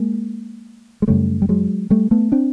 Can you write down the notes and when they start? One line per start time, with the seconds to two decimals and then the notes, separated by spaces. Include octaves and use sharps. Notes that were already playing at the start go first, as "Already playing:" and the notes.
Already playing: G#3 A#3
1.02 G#3
1.08 F#2 C#3 G3 A3
1.42 G3
1.49 F#3 G#3
1.90 G3 A3
2.11 A3 B3
2.32 C4 D4